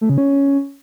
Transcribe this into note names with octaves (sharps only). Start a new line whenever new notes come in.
A3
C#3
C#4